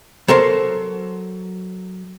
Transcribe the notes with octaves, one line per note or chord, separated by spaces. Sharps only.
F#3 A4 A#4 C5